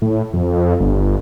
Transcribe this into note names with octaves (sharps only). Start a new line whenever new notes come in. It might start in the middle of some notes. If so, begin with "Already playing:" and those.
A2
F2
G1